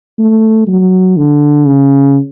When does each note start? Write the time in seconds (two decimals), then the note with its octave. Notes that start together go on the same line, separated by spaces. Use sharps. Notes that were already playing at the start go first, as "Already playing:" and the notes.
0.18 A3
0.67 F#3
1.17 D3
1.66 C#3